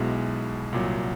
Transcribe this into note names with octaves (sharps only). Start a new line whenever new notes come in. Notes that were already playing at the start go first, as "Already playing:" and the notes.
Already playing: B1 B2 G#3 B3 E4
C2 A#2 F#3